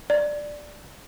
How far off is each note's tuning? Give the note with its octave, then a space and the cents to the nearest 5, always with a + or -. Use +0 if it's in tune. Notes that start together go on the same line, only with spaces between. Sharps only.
D5 +5